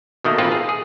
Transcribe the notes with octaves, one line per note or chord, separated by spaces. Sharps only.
B2 D#3 A3 A#3
A1 A#3 C4 F4 A4 B4
G#4
G#4